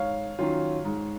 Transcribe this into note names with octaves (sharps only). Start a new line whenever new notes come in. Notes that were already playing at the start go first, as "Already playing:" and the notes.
Already playing: G#2 C#5 F5
D#3 F#3 C#4 F4
G#2